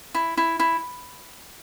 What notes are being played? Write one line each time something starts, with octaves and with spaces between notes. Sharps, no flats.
E4
E4
E4